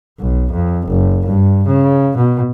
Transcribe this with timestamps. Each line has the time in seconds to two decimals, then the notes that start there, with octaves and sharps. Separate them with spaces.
0.20 B1
0.52 F2
0.87 F#1
1.26 G2
1.66 C#3
2.16 B2